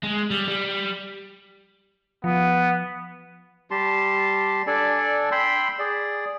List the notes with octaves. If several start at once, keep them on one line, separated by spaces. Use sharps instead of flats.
G#3
G3
G3
F3 B3
G3 G4 A5 C6
D4 A4 D5 G#5
G5 B5 C6 E6
G#4 D5